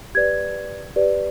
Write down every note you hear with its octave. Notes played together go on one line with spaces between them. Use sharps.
G4 B4 D5 G#6
G4 B4 D5